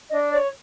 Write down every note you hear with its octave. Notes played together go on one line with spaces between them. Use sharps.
D4 D#5
C#5 D5